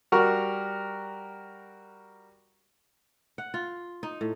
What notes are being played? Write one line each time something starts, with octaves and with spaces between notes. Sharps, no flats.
G3 F#4 A#4 C#6
F#5
F4
D#4
A2